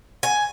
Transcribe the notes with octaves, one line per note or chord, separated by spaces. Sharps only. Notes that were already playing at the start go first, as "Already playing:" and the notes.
G#5